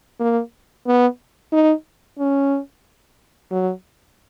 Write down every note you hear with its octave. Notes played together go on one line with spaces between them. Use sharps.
A#3
B3
D#4
C#4
F#3